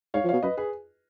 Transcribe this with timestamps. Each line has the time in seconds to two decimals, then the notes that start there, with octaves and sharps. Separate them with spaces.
0.14 G#2 C#5 F5
0.24 F3
0.29 B2 C#5 F5
0.43 F#2 B4 D#5
0.57 G#4 B4